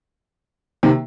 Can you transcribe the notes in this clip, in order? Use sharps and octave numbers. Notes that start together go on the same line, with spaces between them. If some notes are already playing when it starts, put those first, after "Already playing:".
C3 D#3